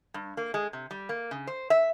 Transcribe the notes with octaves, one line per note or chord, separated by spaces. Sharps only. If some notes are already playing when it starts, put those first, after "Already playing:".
G2
A#3
G#3
C3
G3
A#3
C#3
C5
E5